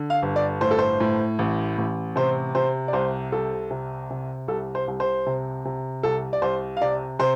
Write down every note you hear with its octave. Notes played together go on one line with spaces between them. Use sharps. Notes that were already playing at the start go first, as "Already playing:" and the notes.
Already playing: D3
F5
G1
D5
A2 C5
A4
C5
A2
A1
A1
C3 C5
C3 C5
D5
C2 C5
C2 A4
C3
C3
C2 A4
C5
C2
C5
C3
C3
C2 A4
D5
C2 C5
F5
C3 D5
C3 C5